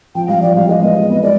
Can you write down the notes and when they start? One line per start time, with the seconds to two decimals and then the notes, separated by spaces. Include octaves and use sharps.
0.15 F3 G5
0.28 G3 F5
0.42 F3 D5
0.55 G3 F5
0.69 G#3 D#5
0.82 B3
0.95 G#3
1.10 B3
1.22 G#3 D5